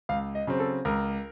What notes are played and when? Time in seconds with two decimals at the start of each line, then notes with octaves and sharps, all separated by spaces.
0.09 C#2 F5
0.35 D#5
0.47 C#3 F#3 C4
0.60 A4
0.85 C#2 A#4